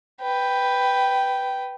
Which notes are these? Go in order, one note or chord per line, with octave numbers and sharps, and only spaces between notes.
B4 G5